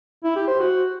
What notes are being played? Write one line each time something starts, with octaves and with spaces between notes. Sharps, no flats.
E4
G4
C5
F#4